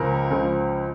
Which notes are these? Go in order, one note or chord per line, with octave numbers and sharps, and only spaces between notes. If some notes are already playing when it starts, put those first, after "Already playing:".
Already playing: C#2 C#3 F3 A#4
C#2 C#3 F3